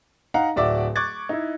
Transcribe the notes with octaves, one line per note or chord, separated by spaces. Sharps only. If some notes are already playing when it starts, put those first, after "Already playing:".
D#4 F5 F#5 A#5
D1 F#4 D5 E5 D6
C#6 D6 F#6 G#6 A6
D#4 E4